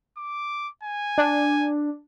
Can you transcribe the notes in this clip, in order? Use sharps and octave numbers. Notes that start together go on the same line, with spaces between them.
D6
G#5
D4